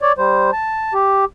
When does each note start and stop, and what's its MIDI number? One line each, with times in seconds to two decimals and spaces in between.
0.01 0.12 73
0.01 0.12 74
0.18 0.51 55
0.18 0.51 72
0.53 0.93 81
0.94 1.25 67